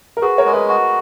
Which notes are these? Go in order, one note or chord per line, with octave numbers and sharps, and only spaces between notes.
A#4
F#4 G#4 B4
A#4 C#5
G#3
B4 D#5
F#4